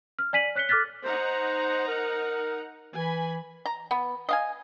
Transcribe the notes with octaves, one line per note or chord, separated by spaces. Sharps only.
F6
D5 G#5 B6 D#7 F#7
C#5 F#6 B6 C#7 G7
A4 D6 F6 F#6 A6 B6
D#4 C5 F#5 A#5
A#4
E3 G#5 B5
A#5
B3
D#5 F5 G#5